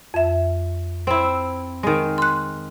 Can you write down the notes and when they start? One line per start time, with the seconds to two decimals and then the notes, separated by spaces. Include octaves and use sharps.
0.14 F2 E5
1.07 C4 E4
1.83 D#3 G#3
2.18 C6 F#6